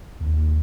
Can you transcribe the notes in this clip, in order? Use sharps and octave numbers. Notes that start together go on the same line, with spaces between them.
D#2